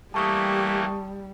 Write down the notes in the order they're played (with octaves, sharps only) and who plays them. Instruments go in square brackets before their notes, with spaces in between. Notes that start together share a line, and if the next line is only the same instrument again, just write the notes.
[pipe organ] E3 A3 A#3 [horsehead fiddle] G3 [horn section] G4 [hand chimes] A5 C#6 D#6